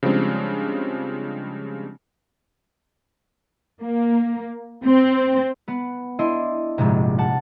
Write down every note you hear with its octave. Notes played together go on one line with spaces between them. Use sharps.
C#3 F3 G3 G#3 C4 D4
A#3
C4
B3 B4
D4 E4 D#5 C6
F1 A#1 G#2 C3
G3 F#5 A5